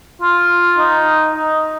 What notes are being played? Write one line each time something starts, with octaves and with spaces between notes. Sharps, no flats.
F4
D#4
D#4